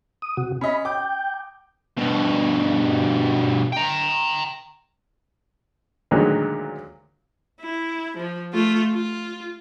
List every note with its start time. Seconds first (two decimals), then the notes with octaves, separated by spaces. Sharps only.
0.22 D#6
0.37 C3 F#4
0.61 C#4 D#5 B5
0.85 G5 D6
1.98 G2 B2
3.72 G5 A#5
6.11 D2 A#2 D#3 F#3 G#3
7.60 E4
8.17 F3
8.53 A3 F4
8.94 F4